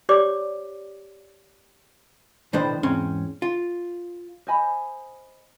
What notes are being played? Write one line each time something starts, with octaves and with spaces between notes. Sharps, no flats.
G4 C#5 D5 D6
B1 A2 D#3 B3 D4 C5
E2 G#2 C4 C#4
F4
C5 D#5 G#5 B5